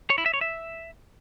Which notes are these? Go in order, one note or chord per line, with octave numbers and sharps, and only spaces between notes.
C#5
E4
E5
C#5
E5